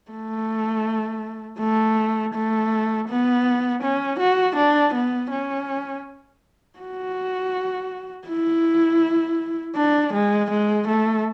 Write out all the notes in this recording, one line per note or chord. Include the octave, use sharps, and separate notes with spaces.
A3
A3
A3
B3
C#4
F#4
D4
B3
C#4
F#4
E4
D4
G#3
G#3
A3